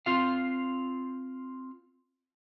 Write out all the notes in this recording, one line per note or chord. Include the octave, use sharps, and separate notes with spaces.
C4 F4 F5